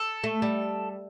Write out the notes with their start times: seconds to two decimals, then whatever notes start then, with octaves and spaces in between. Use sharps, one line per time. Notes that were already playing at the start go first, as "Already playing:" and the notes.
Already playing: A4
0.24 A3
0.42 G3